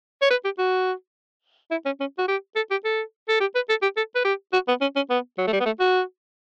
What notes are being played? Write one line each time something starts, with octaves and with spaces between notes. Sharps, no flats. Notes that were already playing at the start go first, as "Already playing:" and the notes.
C#5
B4
G4
F#4
E4
C#4
C#4
F#4
G4
A4
G4
A4
A4
G4
B4
A4
G4
A4
B4
G4
F#4
B3
C#4
C#4
B3
F#3
A3
G3
B3
A3
F#4